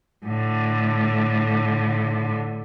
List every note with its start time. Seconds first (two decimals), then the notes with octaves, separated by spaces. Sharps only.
0.25 A2 D3